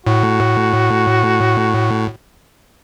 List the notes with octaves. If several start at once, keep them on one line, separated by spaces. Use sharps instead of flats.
A2 F#4